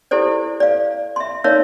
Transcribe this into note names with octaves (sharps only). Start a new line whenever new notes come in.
E4 G4 A4 C5 D5
D5 F5
E5 C6
D#4 A#4 C#5 D5 E5 F5